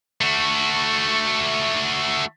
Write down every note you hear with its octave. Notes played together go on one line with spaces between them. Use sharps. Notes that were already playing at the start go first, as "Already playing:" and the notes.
A3 F#4